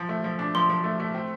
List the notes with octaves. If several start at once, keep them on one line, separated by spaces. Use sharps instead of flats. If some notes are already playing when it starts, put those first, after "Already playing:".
Already playing: F3
A3
F3
D4
F3 C6
F3
A3
A3
C4